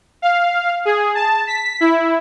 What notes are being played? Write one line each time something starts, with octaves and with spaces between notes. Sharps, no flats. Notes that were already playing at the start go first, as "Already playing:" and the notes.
F5
G#4
A5
B6
E4